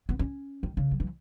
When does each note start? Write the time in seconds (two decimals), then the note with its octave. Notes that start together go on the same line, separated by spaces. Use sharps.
0.09 B3
0.19 C#4
0.63 D#3
0.77 C#3
0.91 F#3
1.00 E3